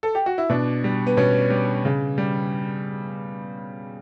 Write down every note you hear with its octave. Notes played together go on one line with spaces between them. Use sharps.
A4
G4
F#4
E4
B2 D4
G3
B3
B2 C#4
G3
C#3
G3